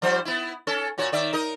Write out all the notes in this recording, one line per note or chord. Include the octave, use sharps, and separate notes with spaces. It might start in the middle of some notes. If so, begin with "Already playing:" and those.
F3 G3 C5
B3 E4
C#4 A4
A#2 F#4 C#5
D#3 D5 E5
D#4 A#4 D#5